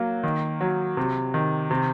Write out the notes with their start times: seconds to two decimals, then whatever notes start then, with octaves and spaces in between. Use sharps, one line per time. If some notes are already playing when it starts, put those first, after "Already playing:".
Already playing: F#3 A#3
0.23 D#3
0.61 F#3
0.97 C3
1.34 D#3
1.71 C3